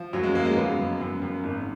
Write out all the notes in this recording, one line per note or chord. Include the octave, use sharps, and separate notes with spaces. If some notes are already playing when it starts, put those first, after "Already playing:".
Already playing: F3
F#2 F#3
G#3
F#2 A#3
G#3
F#2 B3
F#2
F#2
F#2
G#1